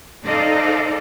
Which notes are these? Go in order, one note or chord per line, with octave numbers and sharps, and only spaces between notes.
D#4 A4 C5 D5 D#5 F5